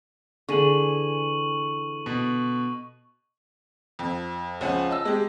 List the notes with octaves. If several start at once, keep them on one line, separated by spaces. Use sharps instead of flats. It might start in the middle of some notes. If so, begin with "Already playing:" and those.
D3 E3 G#4 C#6 D#7 F#7
B2
F2
C#2 F3 C#4 F#5 G#5
D#5 A5 E6
G#3 G4